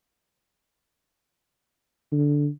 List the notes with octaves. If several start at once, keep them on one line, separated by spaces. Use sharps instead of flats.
D3